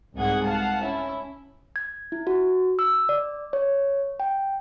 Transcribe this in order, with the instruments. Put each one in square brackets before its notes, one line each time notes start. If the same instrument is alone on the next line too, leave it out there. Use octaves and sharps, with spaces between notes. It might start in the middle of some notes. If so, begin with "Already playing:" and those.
[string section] C2 G#2 G#4 F#5 G#6
F5 F#5 A5
C#4 E4
[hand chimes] G#6
E4
F#4
E6
D5
C#5
G5